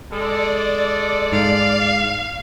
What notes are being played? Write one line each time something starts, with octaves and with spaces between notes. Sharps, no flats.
G#3 A4 D5
G#2 F5